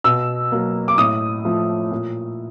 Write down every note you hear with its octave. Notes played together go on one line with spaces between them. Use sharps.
B2 E6
F#3 A#3
D6
A2 D#6
F3 A3
A#2